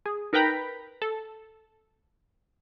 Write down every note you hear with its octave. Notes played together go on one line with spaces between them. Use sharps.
G#4
D#4 A#4 B4 G5 A#5 B5
A4